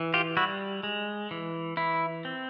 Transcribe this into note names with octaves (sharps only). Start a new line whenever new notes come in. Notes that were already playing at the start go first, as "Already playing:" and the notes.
Already playing: E3
F4 G4
G3 E4 F#4
G#3
E3
E3 E4
C4